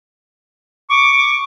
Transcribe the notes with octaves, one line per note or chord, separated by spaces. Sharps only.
C#6 D6